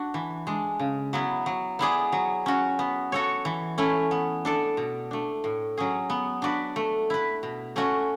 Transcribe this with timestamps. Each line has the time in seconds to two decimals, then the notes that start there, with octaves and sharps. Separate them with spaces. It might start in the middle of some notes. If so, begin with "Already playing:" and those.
Already playing: D4 F#4
0.14 E3
0.47 G#3 D4
0.80 C#3
1.13 F#3 B3 E4
1.46 F#3
1.79 B3 E4 G#4 D5
2.12 F#3
2.46 C#4 F#4
2.79 B3
3.12 F#4 A4 C#5
3.45 E3
3.78 A3 C#4 E4
4.11 B3
4.45 D4 A4 D5
4.77 B2
5.11 A3 D4
5.44 A2
5.77 F#3 C#4 G#4
6.10 B3
6.42 D4 F#4 B4 D5
6.76 A3
7.10 E4 B4
7.43 B2
7.76 A3 C#4 F#4